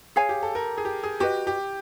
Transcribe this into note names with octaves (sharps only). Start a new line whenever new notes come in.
G#4 C#5 F5 G#5
G4
A4
A#4
G#4
G4
G#4
F#4 G4 B4 D#5
G4